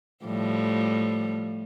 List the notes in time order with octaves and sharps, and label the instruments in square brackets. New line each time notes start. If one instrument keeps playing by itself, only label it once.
[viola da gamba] A2 F3 G3